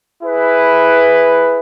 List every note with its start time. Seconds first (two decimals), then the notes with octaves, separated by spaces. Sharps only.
0.22 E4 G#4 B4